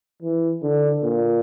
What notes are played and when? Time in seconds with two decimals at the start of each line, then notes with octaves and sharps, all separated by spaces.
0.23 E3
0.63 D3
1.03 A#2